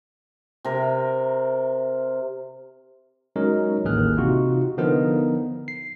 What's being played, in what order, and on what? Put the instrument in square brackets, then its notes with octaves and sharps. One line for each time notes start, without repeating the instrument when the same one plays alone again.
[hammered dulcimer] C3 A#4
[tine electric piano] F#3 G#3 C#4 D#4 A#4
A1 D#2 D#3 G#4 F6 F#6
C3 D#4 F4 F#4
D3 F3 B3 D#4 A#4
C7